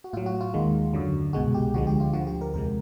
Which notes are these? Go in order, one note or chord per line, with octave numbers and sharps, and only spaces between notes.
F#4
A2 F#3 F4
F#4
F4
D#2 D#3 G#3
F#2 D3 F#3
C2 B2 G#3 F#4
G4
D2 D3 F3 G#3 F#4
G4
F4
D2 D3 F3 F#4
G4
A#4
E2 C3 F3 G#3 A#4